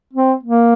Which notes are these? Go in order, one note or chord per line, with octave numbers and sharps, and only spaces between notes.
C4
A#3